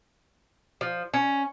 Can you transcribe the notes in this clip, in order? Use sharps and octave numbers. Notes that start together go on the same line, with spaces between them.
F3
C#4